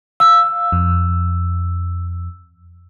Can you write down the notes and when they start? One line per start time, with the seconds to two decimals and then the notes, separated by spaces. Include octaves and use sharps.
0.20 F5 E6
0.72 F2